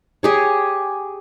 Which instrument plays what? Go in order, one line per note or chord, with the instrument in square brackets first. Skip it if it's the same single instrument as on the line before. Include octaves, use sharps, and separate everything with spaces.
[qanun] G4 G#4 C#5